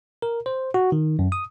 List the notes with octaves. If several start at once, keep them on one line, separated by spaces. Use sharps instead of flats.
A#4
C5
F#4
D#3
F#2
D#6